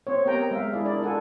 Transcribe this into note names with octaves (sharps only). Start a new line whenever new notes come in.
C4 C5 C#5
B3 G4 A#4 D#5 G5 A#5
G#3 E5 F5
G#3 E4 G#4 D5
D4 A#4 D5
D4 F4 A4 F#5 G#5